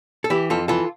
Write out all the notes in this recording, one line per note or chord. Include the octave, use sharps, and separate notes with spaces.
A4
E3 E4 G4
F2 F4 A4
E3 F4 A4